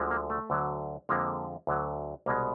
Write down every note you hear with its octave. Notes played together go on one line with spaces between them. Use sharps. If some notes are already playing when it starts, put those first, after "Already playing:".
Already playing: D2 D3 F3 G#3
A#3
A3
D2 D3 F#3
F2 D3 F3 G#3 A#3
D2 D3 F#3
C2 B2 G#3 A#3